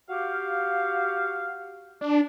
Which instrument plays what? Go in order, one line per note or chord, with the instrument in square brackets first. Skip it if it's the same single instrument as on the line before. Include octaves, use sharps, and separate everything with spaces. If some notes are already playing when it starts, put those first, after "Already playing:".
[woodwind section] F#4 G4 F5
[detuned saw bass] D4